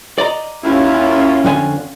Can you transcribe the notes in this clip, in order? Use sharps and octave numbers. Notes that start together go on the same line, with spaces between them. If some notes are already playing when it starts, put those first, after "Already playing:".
D5 D#5 A#5
D#2 C#4 E4 F4
F2 D3 G#5